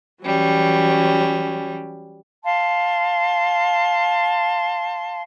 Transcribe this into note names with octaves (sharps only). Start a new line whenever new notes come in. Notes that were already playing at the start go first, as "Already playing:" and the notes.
E3 F#3 G3 C#4
F5 A5 C6